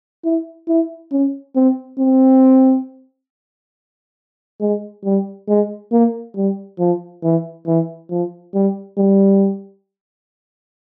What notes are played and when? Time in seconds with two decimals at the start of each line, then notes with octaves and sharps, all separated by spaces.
0.24 E4
0.68 E4
1.12 C#4
1.55 C4
1.99 C4
4.61 G#3
5.05 G3
5.48 G#3
5.92 A#3
6.36 G3
6.79 F3
7.23 E3
7.67 E3
8.10 F3
8.54 G3
8.97 G3